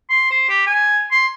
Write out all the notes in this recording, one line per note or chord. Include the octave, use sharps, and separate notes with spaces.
C6
C5
G4
G#5
C6